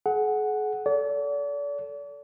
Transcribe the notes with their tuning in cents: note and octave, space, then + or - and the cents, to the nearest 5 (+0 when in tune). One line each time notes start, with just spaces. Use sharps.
G#4 +40 F#5 +0
A4 +0 D5 -40